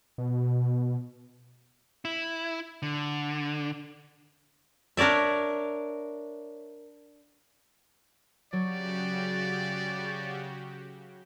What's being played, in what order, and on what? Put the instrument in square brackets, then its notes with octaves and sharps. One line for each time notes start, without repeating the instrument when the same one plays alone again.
[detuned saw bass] B2
[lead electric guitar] E4
D3
[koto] D4 A#4 C#5 D5 E5
[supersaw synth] C#3 F#4 G4 [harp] F#3 C#5 [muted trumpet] D5